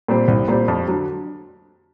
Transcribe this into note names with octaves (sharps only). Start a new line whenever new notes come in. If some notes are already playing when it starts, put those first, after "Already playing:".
A#2 G3 C4
C2
A#2 G3 C4
F2
D3 F#3